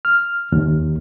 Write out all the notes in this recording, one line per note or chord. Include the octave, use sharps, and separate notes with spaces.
F6
D#2